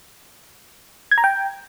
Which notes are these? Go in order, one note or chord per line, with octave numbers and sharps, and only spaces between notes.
G#6
A#5
G5